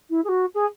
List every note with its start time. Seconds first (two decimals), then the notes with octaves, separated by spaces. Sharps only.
0.10 E4
0.24 G#4
0.28 F#4
0.54 G#4